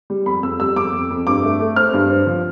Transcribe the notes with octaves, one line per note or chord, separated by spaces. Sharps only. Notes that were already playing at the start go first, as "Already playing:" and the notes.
G3
F2 B5
F2 E6
G3 E6
F2 D6
F2
F2
G2 D6
A3
A3
C4 F6
G2
C4
F3